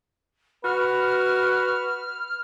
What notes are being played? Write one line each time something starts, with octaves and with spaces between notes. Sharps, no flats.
F#4 B4 F6